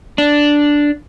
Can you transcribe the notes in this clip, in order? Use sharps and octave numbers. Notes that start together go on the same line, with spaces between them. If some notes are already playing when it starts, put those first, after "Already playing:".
D4